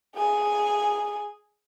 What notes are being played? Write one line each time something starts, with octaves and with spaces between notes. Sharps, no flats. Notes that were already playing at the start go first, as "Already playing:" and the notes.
G#4 G#5